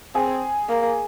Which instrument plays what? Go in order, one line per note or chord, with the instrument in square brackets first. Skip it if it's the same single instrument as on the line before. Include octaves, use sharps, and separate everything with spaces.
[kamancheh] C4 [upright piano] G#4
[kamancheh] A#3